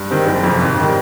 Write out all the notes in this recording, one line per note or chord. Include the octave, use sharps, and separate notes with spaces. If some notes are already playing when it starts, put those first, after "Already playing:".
Already playing: G2
D#3 G3 C4
F#1
F2 C3
G#1
D#3 G3